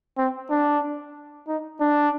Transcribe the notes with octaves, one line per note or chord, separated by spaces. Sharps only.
C4
D4
D#4
D4